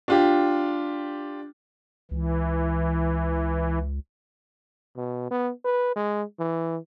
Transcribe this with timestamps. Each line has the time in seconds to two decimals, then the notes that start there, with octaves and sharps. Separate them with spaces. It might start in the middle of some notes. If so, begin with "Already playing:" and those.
0.08 D4 F4 G4
2.11 C#2 E3
4.97 B2
5.31 B3
5.65 B4
5.96 G#3
6.39 E3